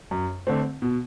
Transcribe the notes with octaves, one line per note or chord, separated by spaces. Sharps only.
F#2
D3 A3 C4
B2